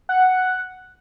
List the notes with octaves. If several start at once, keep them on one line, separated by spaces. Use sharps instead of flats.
F#5